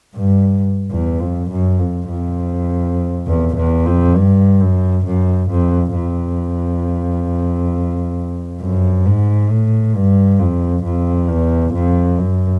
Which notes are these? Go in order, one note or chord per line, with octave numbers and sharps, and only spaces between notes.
G2
E2
F2
F#2
F2
F2
E2
E2
F2
G2
F#2
F#2
F2
F2
F#2
G#2
A2
G2
F2
F2
E2
F2
F#2